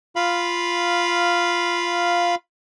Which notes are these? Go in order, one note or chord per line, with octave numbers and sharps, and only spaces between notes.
F4 F5 B5